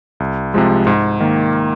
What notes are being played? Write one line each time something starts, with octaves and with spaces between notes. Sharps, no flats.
C2
C3 F3 G#3
G#2
D#3 A#3